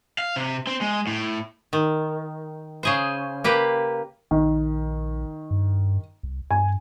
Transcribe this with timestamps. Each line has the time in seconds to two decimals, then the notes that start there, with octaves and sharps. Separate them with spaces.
0.18 F5
0.36 C3
0.67 C4
0.81 G#3
1.07 A2
1.73 D#3
2.83 C#3 G#4 C5
3.44 A#3 G4 B4
4.31 A#1 D#3
5.51 G2
6.23 C2
6.51 G2 G#5